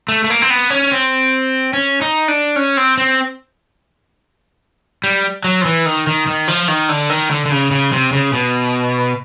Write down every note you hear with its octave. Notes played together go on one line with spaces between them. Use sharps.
A3
A3
A#3
C4
B3
C#4
C4
C#4
D#4
D4
C#4
C4
C4
G3
F#3
F3
E3
D#3
D#3
D#3
F3
D#3
D3
D#3
D3
D3
C#3
C#3
C3
C#3
B2